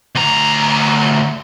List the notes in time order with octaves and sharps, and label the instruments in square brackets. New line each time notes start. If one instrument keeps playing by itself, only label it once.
[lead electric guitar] D2 A#5